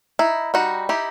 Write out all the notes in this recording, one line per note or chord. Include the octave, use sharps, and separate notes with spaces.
D#4 E4
G3 D#4 F#4
D#4 E4 G4